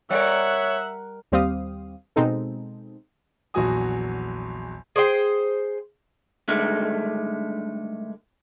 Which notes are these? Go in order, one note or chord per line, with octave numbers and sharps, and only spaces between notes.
G3 A#4 C#5 E5 F#5 F#6
D#2 G3 C4 G4 F5 D#6
B2 G#3 C4 D#4 A4
A#1 E2 F#3 F#4 G#5 D#6
G#4 C5 D5 G5
G2 D3 D#3 G#3 A3